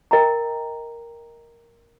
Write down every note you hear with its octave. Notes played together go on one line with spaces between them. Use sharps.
A#4 D#5 G5 A#5